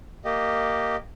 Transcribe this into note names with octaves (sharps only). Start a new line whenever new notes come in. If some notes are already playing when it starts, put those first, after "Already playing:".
A#3 G4 D#5